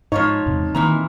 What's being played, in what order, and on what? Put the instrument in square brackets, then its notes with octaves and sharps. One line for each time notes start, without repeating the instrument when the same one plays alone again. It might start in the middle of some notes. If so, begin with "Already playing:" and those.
[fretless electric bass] G#2 [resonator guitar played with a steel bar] F3 F4 C#5 [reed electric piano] D#4
[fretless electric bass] E2 G#2 C3
[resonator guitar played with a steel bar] A#2 E3 A#5 [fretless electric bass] D#3 A#3 C4